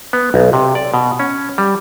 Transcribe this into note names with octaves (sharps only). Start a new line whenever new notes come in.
B3
B1
C3
D5
B2
C#4
G3